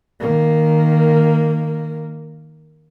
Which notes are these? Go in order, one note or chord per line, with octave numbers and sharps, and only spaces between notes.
D#3 A#3